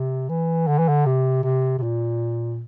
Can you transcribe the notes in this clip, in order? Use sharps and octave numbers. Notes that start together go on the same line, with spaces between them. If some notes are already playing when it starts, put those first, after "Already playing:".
Already playing: C3
E3
D3
E3
D3
C3
C3
C3
A#2